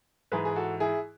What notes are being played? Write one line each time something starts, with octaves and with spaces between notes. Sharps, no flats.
G#2 E3 G#4 B4
G#4
F#4 A4
E4 G#4